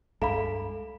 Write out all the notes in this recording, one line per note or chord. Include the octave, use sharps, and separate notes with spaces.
C#2 G2 G#3 A4 F5 A#5 B5